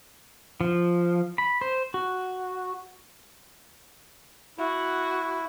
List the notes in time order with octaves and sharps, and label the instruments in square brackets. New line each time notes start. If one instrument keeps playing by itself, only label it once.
[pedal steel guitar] F3
B5
C5
F#4
[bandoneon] E4 [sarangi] F#4